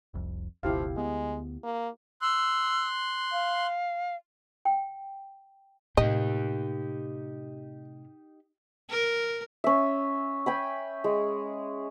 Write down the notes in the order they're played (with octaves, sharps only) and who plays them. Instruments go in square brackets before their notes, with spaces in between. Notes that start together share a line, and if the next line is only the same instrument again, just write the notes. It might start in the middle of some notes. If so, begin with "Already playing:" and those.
[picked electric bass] F1 C2 F2
[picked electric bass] F#1 C#2 B2 [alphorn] F3 [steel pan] E4 G4 F5
[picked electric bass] D2 B3 [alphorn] G#3
[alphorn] A#3
[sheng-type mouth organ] C6 F#6 [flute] E6
[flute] F5
[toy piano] G5
[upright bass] A2 C3 [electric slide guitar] D#4 G4 [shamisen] D#5
[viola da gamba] A#4
[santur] C#4 E5
G5 G#5 B5
G#3